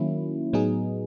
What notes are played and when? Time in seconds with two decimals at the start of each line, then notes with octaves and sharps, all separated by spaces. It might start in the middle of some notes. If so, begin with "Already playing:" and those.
Already playing: D#3 F#3 A#3 C#4 E4
0.53 A2 F#3 B3 D#4 G#4